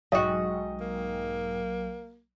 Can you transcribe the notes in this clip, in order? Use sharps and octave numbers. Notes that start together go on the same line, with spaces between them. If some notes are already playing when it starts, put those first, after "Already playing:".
B1 G#2 F#3 F#4 D#5 G5
A#3